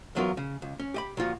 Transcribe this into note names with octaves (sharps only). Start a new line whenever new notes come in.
E2 G#2 F#3 B3 F4 A#4
C#3
C#2
C#4
G4 D#5 B5
A#2 F3 F4 F#4